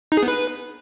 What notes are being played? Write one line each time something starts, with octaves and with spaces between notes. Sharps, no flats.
D#4
G#4
B3
B4